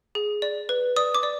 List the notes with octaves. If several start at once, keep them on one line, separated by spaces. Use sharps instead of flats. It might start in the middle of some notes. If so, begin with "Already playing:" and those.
G#4
D5
B4
D5 D#6
D6
D5